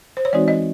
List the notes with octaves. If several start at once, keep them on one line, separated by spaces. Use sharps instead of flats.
C5
C#5
E3 G#3 C4 D#4 F#4 D5
D#5